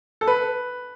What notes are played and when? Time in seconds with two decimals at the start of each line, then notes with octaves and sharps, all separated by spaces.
0.21 A4
0.27 B4